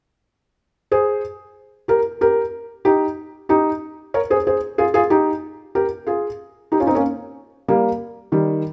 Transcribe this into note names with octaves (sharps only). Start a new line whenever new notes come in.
G#4 C5
G4 A#4
G4 A#4
D#4 G4
D#4 G4
A#4 C#5
G#4 C5
G#4 C5
F4 G#4
F4 G#4
D#4 G4
G4 A#4
F4 G#4
D#4 G4
C#4 F4
C4 D#4
A#3 C#4
G3 A#3
D#3 G3